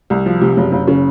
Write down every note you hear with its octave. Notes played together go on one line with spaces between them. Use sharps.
C2
F3
C3
F#1
F#1
C#3